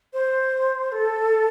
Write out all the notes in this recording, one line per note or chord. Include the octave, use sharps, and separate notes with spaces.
C5
A4